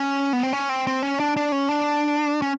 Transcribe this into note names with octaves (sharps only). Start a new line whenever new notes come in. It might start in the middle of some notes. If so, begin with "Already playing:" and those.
Already playing: C#4
B3
C4
C#4
C4
C4
C#4
D4
D4
C#4
D4
C#4